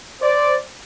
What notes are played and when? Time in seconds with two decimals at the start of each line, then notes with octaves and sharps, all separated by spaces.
0.22 C5 D5